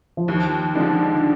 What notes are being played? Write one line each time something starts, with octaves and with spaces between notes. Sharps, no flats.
F3
D#2 D#3
D3 D#3 F3 G#3 D4